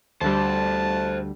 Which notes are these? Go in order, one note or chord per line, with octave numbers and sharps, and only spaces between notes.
D2 D3 G3 A4 C5 A5